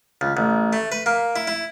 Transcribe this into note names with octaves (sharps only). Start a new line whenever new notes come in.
C#2
A1
A3
B4
A#3
E4
E4